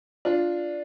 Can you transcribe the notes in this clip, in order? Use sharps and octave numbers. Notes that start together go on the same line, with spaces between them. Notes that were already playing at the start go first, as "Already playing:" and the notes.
D4 F4